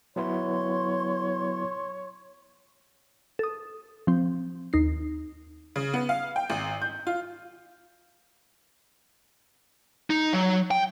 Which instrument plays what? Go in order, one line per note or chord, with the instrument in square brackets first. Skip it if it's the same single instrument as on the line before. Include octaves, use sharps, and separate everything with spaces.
[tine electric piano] F#3 B3 E4 [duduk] C#5 [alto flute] C6
[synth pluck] A4 D#6
F3 C4
D#2 D#4 C7
[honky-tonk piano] C#3
B3
F5
G5
G#1
G6
F4
[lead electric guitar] D#4
F#3
G5